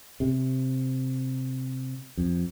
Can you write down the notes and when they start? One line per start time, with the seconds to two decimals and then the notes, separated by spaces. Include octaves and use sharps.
0.20 C3
2.17 F2